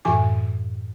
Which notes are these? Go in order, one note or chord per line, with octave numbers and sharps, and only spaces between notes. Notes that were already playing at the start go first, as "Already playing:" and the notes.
F#2 A2 E3 G#5 D6